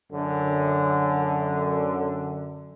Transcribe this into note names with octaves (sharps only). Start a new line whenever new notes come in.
F#2 D3